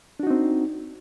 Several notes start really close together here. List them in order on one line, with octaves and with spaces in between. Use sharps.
D4 F#4 D#4 C4